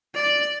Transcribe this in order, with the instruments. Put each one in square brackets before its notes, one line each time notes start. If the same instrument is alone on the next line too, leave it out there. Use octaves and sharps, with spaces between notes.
[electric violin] D5